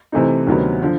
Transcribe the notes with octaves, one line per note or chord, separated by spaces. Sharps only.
C3 E3 A3 C4 D#4
D2 C3 D#3 F#3 B3
D3 F3